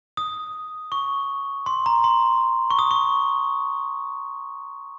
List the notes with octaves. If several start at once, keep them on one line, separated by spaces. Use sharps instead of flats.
D#6
C#6
C6
A#5
C6
C#6
D#6
C#6